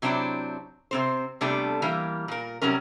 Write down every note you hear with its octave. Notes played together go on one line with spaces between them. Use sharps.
C3 F#3 C4 D4 E4 G5
C3 C4 C5
C3 G3 A3 B3 D4 A4
E3 G3 A#3
A#2 A#4
C3 F#3 G3 C#4 A#4